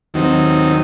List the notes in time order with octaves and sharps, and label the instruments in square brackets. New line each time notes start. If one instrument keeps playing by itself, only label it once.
[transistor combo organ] D#2 D#3 F#3 C4 D#4